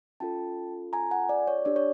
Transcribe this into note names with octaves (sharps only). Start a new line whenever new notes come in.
C#4 F4 A4 G5 A5
G#5 A#5
F#5 G#5
D5
C#5
D4 G4 D5
C#5